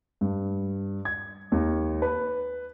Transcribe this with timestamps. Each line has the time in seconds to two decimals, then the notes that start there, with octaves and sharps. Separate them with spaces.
0.21 G2
1.05 G#6
1.52 D#2
2.02 B4